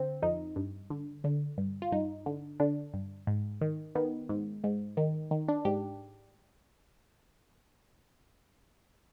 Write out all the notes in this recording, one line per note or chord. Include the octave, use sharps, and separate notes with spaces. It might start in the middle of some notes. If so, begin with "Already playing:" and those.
Already playing: D3 C4
F2 D#4
G2
D3
D3
G2
F4
G2 D#4
D3
D3 D4
G2
G#2
D#3
D#3 B3
G#2
G#2
D#3
D#3
D4
G#2 G4